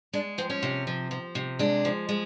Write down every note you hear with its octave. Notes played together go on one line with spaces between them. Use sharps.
G#3 D4
F3 C4
C#4
C3
F3
F3
C3
G#3 D4
F3
G#3